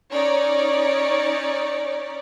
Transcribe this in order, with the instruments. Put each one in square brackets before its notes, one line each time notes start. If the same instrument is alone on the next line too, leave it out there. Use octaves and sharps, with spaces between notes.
[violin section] C#4 D#4 C#5 D5